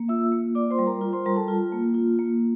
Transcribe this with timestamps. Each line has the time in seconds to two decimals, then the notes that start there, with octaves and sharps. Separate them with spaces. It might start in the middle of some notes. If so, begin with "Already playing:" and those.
Already playing: A#3
0.08 F4 E5 E6
0.32 A#3
0.55 F4 D5 D6
0.70 C5 C6
0.79 G3
0.86 A#4 A#5
1.01 F4
1.13 C5 C6
1.25 G3 A#4 A#5
1.36 A4 A5
1.48 F4
1.72 A#3
1.94 F4
2.19 A#3